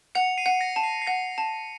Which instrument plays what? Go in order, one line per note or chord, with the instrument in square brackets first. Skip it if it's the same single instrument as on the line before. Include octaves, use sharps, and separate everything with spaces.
[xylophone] F#5 [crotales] C#7 F7
[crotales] C7 D#7
[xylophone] F#5
[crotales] A#6 C#7
[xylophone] A5
[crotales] C7
C7
[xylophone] F#5 [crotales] A#6
[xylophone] A5